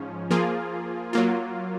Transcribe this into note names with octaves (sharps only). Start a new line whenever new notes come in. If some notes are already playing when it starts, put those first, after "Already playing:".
Already playing: G#2 F3 C#4
F3 A#3 F4 G#4
F#3 A#3 F4